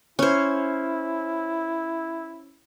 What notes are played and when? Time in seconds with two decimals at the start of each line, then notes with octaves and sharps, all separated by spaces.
0.19 C#4 E4 C5